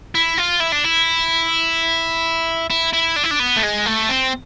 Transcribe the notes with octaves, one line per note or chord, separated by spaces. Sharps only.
E4
F4
E4
D4
E4
E4
E4
D4
E4
D4
B3
A3
G#3
A3
C4